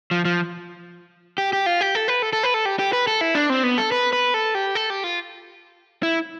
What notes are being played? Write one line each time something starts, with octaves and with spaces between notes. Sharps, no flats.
F3
F3
G4
G4
F4
G4
A4
B4
A4
A4
B4
A4
G4
G4
B4
A4
E4
D4
C4
B3
A4
B4
B4
A4
G4
A4
G4
F4
E4